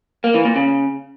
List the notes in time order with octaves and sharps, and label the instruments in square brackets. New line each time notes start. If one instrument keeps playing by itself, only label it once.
[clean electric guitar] A#3
E3
A#2
C#3